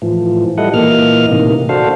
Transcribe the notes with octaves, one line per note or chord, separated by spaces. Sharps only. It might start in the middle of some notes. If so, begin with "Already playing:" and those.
A2 E3 F3
G3 E4 A4 D#5 F#5
A#2 E3 A#3 D#5 F6
A2 C3 D#3 A#3
D4 F#4 A4 C5 F5